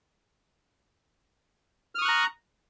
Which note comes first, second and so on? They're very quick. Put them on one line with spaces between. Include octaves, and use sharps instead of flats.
F6 D#6 C#6 F#6 A#5